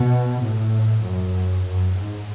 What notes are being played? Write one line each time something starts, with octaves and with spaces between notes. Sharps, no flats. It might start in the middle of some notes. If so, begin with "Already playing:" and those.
Already playing: B2
A2
F#2
F#2
G#2